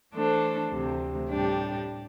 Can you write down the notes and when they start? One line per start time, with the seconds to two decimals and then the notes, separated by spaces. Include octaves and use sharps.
0.14 E3 A3 D4 A4 C5
0.72 D2 C3 E3
1.29 A2 G3 D4 G4